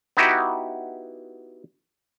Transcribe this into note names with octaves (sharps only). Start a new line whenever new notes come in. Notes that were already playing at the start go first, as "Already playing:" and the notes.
B3 D#4 E4 F#4 G4